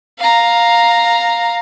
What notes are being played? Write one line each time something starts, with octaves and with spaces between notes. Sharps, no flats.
F5 A#5